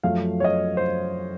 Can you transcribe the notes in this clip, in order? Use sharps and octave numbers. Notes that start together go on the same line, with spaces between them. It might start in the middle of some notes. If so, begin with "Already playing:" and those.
F#2 F3 A3 F5
C#5
D#5
C5